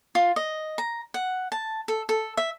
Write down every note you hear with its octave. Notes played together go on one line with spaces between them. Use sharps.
F4
D#5
A#5
F#5
A5
A4
A4
E5